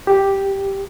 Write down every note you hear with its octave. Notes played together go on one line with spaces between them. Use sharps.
G4